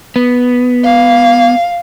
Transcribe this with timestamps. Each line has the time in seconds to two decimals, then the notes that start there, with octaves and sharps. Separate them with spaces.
0.16 B3
0.84 F5